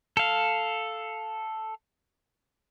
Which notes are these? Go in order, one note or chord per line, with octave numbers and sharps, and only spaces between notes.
A4 F5